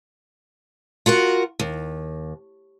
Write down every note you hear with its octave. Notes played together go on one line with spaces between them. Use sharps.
F4 F#4 A#4 F#5
D#2